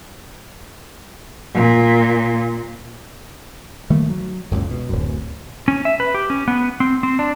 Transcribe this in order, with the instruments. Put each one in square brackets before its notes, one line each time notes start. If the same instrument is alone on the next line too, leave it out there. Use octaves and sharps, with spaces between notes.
[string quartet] A#2
[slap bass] D#3 G3 A3 A#3
F#3
F#1 C#2 A#2
B2
D1 F#2
[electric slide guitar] C#4
E5
B4
G4
C#4
B3
C4
C4
D4